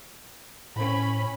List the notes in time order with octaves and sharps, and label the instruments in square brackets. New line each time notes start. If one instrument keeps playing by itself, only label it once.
[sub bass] A2 [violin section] C#4 B5